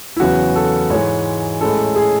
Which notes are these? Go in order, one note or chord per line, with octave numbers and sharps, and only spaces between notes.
E4
E2 C#3 F#3 B3 F#4
A4
G#2 E3 G#3 C#5
A2 G#3 C#4 A4
G#4